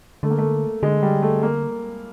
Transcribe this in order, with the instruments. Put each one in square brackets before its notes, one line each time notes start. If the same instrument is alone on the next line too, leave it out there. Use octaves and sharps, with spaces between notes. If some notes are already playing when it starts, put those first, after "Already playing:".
[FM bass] D3 [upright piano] A3
[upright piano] A#3
A3
[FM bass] D3 [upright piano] G#3
[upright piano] G3
A3
A#3